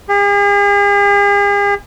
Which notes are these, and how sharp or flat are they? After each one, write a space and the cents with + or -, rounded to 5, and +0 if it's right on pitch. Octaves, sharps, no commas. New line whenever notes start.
G#4 -45